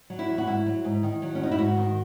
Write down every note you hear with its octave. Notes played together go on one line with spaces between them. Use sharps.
F#3
E4
E2
F#4
G#2 E4
F#3
G#2
D#3
F#3
C#4
F#2 D#4
E4
G#2 F#4
D#3